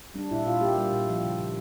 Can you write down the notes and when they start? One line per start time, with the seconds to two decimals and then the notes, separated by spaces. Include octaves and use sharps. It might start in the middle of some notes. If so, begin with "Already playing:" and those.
0.14 G3 D4
0.31 A#2 E4
0.46 A#2 F4
0.61 A#3 G4
0.77 G3
0.92 A#2
1.08 F3
1.23 C#3
1.39 C#3